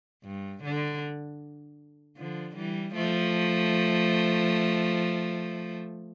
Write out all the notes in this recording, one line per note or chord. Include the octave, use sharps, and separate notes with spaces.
G2
D3
D3 F3
E3 G3
F3 A3